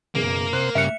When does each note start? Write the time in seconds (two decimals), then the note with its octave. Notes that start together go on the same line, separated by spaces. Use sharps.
0.15 F#1 B2 A#3 G#4
0.53 C3 C5 F#6
0.75 G2 C#3 E5 F6 F#6 C#7 F7